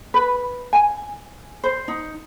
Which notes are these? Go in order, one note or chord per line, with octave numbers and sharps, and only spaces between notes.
B4
G#5
C5
D#4